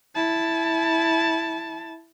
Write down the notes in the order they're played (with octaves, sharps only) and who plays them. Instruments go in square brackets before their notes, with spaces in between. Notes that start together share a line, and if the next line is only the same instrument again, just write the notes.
[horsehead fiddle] E4 A5